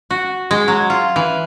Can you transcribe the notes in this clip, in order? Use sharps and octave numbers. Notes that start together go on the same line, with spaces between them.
F#4
G#3
F#3
F4
E3